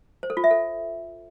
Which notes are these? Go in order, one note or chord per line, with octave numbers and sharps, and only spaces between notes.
C5
A4
F4
E5
A4